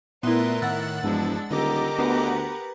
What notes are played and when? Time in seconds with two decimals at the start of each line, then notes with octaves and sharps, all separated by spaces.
0.23 A#2 A3 B3 E4 A#4 B4 E5 C6
0.62 A2 D#3 F#5 E6 F#6 A6
1.03 E1 G2 F3 G#3 D4
1.51 D#1 D3 G4 A#4 D#5 A#5 D6
1.99 D2 B3 B4 F#5